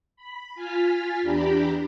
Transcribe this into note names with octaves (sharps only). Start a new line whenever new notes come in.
B5
F4 G#5 F6 A6 B6
E2 D4 G4 A#5 B5